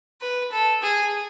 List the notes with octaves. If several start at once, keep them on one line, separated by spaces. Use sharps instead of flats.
B4
A4
G#4